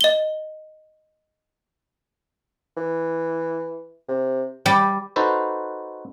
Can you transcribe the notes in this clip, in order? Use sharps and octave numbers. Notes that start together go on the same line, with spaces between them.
D#5 G7
E3
C3
G3 G4
D#4 F#4 A4 B4 C5